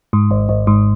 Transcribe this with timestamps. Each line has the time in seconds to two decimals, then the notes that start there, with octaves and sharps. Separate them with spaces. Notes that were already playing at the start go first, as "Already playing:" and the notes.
0.13 G#2
0.31 G#1
0.49 G#1
0.67 G#2